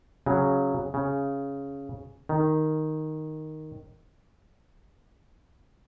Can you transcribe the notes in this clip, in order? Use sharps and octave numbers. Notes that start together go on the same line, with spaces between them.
C#3 F#3
C#3
D#3